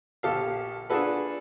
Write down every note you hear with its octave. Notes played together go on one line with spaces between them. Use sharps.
A#1 G4 A4 F5
D4 F4 F#4 G#4 A4 B4